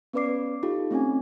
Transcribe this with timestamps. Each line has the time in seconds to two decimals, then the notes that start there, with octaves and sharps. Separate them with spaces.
0.13 B3 C#4 B4 D5 D6 C7
0.63 D#4 F4 G4 A4
0.91 A3 C4 C#4 G#5